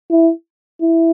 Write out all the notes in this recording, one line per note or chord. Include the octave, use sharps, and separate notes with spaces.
E4
E4